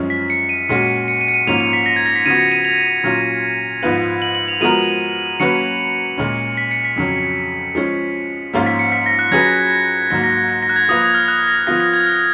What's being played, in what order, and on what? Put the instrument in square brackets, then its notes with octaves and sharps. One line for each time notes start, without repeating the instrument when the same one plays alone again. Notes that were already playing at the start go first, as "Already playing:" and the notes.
Already playing: [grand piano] F#2 F3 G#3 C#4
[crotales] B6
C#7
D#7
[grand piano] A#2 G#3 C#4 F#4
[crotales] C#7
D#7
C#7
D#7
[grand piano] G#2 F3 A#3 C#4 [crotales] F7
[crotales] D#7
B6
A#6
G#6
A#6
B6
[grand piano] C#3 F3 B3 F#4 [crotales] D#7
[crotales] C#7
D#7
F7
[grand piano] A#2 F#3 C#4 F4
G#2 F3 B3 F4 B4
[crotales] F#7
F#7
F7
[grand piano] F3 G#3 B3 F#4 A#4 [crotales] D#7
[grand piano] F#3 A#3 C#4 F#4 B4 [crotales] C#7
[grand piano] A#2 G#3 C#4
[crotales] B6
C#7
B6
[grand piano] F2 C#3 F#3 C#4
F3 G#3 C#4
G#2 F3 A#3 C#4 F4
[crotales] B6
C#7
B6
A#6
F#6
[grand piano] F#3 C#4 G#4 B4 [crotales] G#6
[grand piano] G#2 F#3 A#3 [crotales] A#6
[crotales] A#6
A#6
A#6
A#6
F#6
G#6
[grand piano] F3 A#3 F4 B4 [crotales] D#6
[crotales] D#6
F6
F#6
A#6
[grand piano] F3 B3 F4 [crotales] A#6
[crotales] A#6
G#6
F6